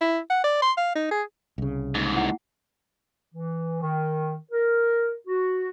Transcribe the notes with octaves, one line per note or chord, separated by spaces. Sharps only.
E4
F#5
D5
C6
F5
D#4
G#4
C2 C#3
D#2 G#2
E4 E5 F#5
E3
D#3
A#4
F#4